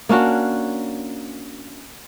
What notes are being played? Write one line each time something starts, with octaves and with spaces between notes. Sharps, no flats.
A#3 C#4 D4 F#4